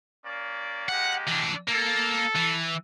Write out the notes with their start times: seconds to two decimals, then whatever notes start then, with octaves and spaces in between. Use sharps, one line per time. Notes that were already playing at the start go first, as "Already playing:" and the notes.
0.24 A#3 C#4 D5
0.89 G#3 A#3 G4 F#5
1.28 E3 D4
1.68 A#3 A4
2.35 E3